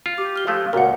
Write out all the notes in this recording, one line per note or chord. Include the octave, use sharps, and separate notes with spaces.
F4
G4 D6
F6 G7
F3 G#3 A3 F5
C#2 A#2 F#4 A#4 F#5